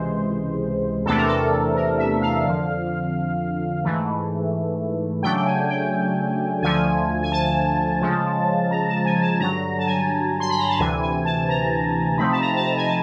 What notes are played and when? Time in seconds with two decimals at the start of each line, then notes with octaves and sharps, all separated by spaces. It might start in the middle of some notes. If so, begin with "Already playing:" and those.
Already playing: C#2 C3 E3 G#3 C5
1.05 E2 C3 E3 A3 D4 A4
1.17 A#4
1.27 A4
1.76 A#4
1.98 E5
2.21 F5
2.45 F2 D3 F3
3.84 G#2 E3 A3
5.23 C#3 F#3 A3 D4 G5
5.36 G5
5.46 G#5
5.69 G5
6.62 D2 D3 F3 A3 G#5
7.23 G#5
7.32 A5
8.01 C#3 F3 G#3
8.71 A#5
8.88 A5
9.05 G#5
9.22 A5
9.40 G2 D3 F#3 A#5
9.79 A5
9.87 G#5
10.40 C6
10.50 B5
10.59 A#5
10.69 A5
10.79 D2 C3 E3 G#5
11.02 G#5
11.25 A5
11.49 A#5
12.18 C3 F3 A3 C4 D#4 B5
12.32 A5
12.41 A#5
12.57 A5
12.65 A#5
12.77 G#5
12.88 A5